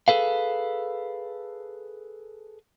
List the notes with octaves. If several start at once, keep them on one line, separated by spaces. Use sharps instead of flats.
G#4 A4 B4 F5